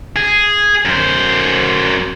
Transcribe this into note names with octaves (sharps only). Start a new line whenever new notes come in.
G#4
F#2 C5